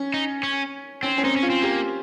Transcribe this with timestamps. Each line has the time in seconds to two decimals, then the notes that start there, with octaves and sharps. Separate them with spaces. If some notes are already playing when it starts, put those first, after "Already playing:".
Already playing: C#4
0.14 D#4
0.43 C#4
1.03 C4 C#4
1.18 C#4
1.23 C4 D#4
1.36 C#4
1.43 F4
1.50 C4
1.62 A#3 G4